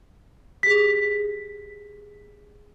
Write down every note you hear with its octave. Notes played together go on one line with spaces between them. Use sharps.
G4 G#4 B6